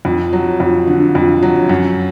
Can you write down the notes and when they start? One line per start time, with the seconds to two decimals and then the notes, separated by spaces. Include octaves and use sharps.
0.05 F2
0.33 F#3
0.60 F2
0.87 D3
1.15 F2
1.43 F#3
1.69 F#2